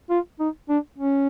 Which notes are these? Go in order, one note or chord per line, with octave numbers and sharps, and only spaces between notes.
F4
D#4
D4
C#4